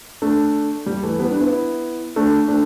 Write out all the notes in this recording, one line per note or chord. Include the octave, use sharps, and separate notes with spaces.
A3 D4
G3
E3 A3
G3 B3
D4
B3 E4
A3 D4
A3 D4